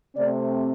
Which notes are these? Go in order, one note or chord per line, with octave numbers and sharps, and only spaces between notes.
C3 A3 C4 D5